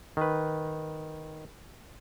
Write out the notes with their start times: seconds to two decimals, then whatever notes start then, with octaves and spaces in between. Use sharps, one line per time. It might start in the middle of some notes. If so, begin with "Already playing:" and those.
0.17 D#3 B4